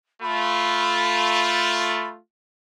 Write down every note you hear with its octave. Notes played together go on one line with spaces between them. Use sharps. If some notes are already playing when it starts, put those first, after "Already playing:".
A3 F4 B5